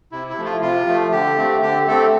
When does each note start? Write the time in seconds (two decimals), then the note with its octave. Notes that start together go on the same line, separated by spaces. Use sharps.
0.12 C3 E4
0.29 E4
0.38 F3 A3
0.45 F4
0.62 C3 F4
0.87 F3 A3
1.12 D3 G4
1.38 A3 C4
1.62 D3 G4
1.87 A3 C4 A4